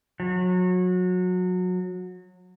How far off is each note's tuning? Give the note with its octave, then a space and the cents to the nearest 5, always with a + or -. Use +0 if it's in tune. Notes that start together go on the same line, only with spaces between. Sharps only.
F#3 -25